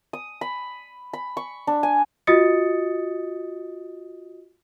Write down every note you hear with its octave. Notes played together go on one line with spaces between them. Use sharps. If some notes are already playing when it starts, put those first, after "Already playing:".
D#6
B5
B5
C#6
D4
G#5
F4 F#4 D#5 D#6 A6 C#7